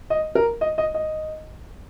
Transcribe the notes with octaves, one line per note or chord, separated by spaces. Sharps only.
D#5
A#4
D#5
D#5
D#5